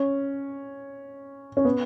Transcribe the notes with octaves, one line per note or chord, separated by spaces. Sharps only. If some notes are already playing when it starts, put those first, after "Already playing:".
Already playing: C#4
C#4
B3